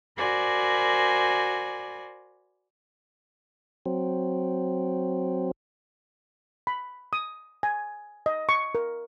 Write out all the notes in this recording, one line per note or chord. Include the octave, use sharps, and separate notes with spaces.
F#4 A#4 C5 D5 G#5 B5
F#3 C4
B5
D#6
G#5
D#5
C#6
A#4